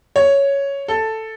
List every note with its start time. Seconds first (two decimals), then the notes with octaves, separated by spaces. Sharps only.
0.16 C#5
0.88 A4